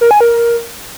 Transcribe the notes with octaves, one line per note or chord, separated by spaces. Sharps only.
A#4
G#5
A#4